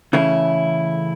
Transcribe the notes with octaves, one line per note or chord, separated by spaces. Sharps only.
C#3 E3 A3 C#4 E4